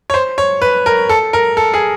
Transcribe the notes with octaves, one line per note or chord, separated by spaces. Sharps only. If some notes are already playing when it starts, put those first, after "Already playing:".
C#5
C5
C#5
B4
A#4
A4
A#4
A4
G#4